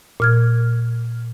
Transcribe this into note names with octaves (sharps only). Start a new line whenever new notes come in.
A#2 F6 G#6